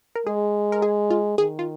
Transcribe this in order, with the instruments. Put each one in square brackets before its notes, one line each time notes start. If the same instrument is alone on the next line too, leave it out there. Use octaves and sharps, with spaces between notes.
[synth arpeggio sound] A#4
[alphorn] G#3 [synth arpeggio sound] G#4
[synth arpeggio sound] A#4
G#4
F4
[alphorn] D#3 [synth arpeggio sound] G#4
[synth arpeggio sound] F4